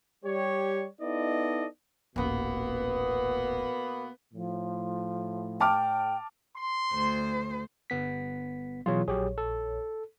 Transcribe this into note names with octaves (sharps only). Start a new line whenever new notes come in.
G3 G4 C#5
B3 D#4 E4 A4 D5 D#5
D#1 A1 B2 A#3 B3
A2 F3
G5 A5 D6 F6
C6
D2 C5
G1 B3 B6
B2 E3 F#3 F4 G#4 C#5
A#1 F#3 G4 G#4 C#5
A4